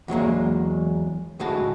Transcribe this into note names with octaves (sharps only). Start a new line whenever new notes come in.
E2 F#3 G#3 A#3
D2 A2 G#3 F#4 A5